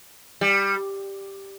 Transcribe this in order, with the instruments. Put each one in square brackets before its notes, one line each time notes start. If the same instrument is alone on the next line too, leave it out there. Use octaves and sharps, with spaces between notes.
[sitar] G3